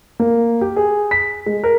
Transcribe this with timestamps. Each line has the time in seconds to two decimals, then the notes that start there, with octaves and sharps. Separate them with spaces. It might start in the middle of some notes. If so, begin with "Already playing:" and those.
0.20 A#3
0.61 G4
0.76 G#4
1.11 B6
1.46 G#3
1.64 A#4